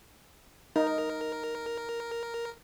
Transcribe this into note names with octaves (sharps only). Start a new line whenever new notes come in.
D#4 A#4